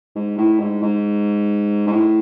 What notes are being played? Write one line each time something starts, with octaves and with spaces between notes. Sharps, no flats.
G#2
A2
G#2
G#2
G#2
A2